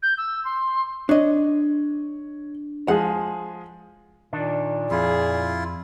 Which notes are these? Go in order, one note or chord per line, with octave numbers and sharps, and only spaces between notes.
G6
E6
C6
D4 C#5 D#5
F3 G#3 G#4 F#5
A#2 D#3 D4
F2 E4 F4 G#4